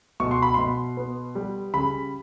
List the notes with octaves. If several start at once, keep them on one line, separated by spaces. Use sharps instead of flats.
B2 C#6
C6
B5
B2 C6
B3
G3
C#3 B5